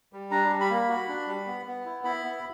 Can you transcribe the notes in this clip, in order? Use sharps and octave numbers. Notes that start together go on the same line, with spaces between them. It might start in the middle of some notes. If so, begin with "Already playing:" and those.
G3
D4 A#5
G3
B5
A#3
F#4
D4
G3
B3
B3
E4
E4 B5
B3